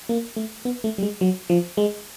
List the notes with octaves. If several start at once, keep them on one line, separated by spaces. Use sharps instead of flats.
A#3
A3
B3
A3
G3
G#3
F#3
F3
G#3